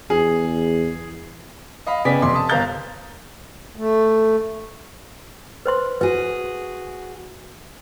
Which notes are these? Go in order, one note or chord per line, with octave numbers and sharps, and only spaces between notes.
E2 G#4
D#5 F5 B5
C#3 B3 D5 G5 G#5 B6
F1 D#5 C6 D6
A5 D#6
G1 A#4 F5 A#5 G6 A6
A3
B4 C5 C6
F#4 G#4 B4